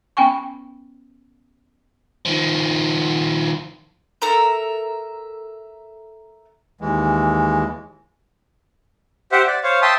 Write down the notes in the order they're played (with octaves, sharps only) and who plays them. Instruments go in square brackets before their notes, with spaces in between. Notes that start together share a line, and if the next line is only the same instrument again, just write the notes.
[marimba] B3 C#4 G5 G#5 C#6
[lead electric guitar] D#3 F3
[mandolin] A4 A#4 E5 A#5
[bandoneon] D#2 E3 G#3
[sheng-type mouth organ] G4 C5 E5 F#5
D5
C5 C#5 F5
E5 G5 A5 C6 D#6